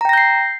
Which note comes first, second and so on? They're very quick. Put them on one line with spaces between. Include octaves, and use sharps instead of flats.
A#5 G5 A#6 G6 C7